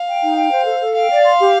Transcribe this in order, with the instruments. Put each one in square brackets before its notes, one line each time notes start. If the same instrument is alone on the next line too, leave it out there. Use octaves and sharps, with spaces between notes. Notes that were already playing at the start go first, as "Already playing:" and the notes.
Already playing: [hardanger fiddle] F5
[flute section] G5
D#4
G5
C5
A4
A4
[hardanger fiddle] F5 [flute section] G5
[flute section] D5
C6
G4